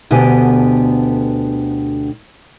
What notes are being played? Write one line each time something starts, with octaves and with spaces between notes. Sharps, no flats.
D2 B2 D3 B3 G4 G#5